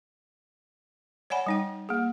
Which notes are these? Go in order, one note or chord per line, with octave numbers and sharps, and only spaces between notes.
C#5 D5 F#5 G#5 B5
G3 D#4 G5
A#3 G#4